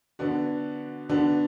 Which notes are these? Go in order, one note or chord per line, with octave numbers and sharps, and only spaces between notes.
D3 B3 D4 F#4
D3 B3 D4 F#4